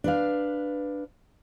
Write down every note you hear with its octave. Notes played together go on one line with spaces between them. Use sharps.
D4 B4 F5